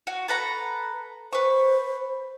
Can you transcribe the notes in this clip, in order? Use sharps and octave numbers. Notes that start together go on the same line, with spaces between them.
F#4
A4 B4 A#5
B4 C5 C#6